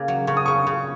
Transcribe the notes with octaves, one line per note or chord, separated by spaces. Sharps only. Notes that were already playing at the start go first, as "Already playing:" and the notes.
Already playing: C#3 A#3
F#3
C#3 C#6
D#6
C#3 C#6
C#3